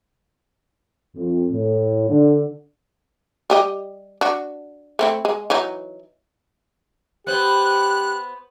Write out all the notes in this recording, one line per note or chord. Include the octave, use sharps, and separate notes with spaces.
F2
A2
D3
G3 G4 D#5
D4 F#4
A3 C4 E4
G#3
E3 F#3 D#4
B3 G4 C5 F#6